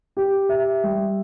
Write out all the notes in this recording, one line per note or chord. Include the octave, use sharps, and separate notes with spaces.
G4
E5
G3